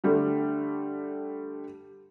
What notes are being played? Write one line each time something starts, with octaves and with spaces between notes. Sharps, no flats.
D3 G3 A3